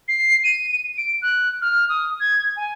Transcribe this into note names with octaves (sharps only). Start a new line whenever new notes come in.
C7
D#7
D7
F#6
F6
D#6
G#6
G#5